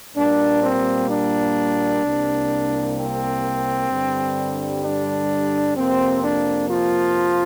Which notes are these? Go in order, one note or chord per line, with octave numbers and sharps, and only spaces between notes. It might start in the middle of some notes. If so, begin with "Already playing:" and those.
A#2 G3 A#3 D4
C4
D4
C2 C3 A#3
C4
G2 D3 G3
D4
F2 C3 A#3 C4
D4
F3 F4